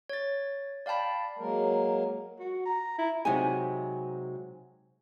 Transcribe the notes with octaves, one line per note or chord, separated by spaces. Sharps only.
C#5 A6
D5 F5 G5 A5 B5
F#3 G#3 A#3 A#4
F#4
A#5
E4
C3 F#3 G#3 D#4 G4 G#5